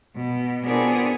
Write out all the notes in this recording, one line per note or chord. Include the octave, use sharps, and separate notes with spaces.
B2
B3 C4 D4 F4 G#4 A#4